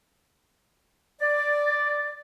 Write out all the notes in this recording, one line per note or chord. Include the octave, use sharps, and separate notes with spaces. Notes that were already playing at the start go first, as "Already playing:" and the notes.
D5